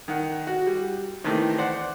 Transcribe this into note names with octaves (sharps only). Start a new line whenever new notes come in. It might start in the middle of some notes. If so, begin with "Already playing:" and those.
D#3 F#5
F#4
G3
C3 D#3 E3 A3
C5 D5 F#5